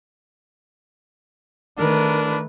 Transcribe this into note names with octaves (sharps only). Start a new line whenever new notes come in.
D#3 A3 D4 A#4 B4